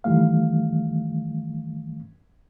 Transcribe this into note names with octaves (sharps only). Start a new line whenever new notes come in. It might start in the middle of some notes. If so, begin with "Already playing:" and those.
F#2 D#3 E3 G3 A3 F5